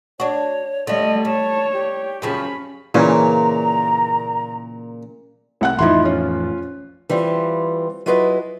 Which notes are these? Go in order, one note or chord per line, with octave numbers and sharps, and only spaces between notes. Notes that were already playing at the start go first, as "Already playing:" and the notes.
D4 F#4 C#5
D3 G3 A3 D#5
G3 C#5 A5
G4
F#2 C#3 F3 C#4 B5
A#2 C#3 E3 C#4 A#5
C2 F#5 F#6
A1 F2 F3 D#4 E4 C6
C#4 F4
E3 G3 C4 F4
F#3 E4 F4 G#4 B4 D#5